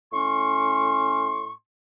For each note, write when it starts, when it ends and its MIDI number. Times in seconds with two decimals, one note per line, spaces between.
0.12 1.51 45
0.12 1.51 61
0.12 1.51 84
0.12 1.51 85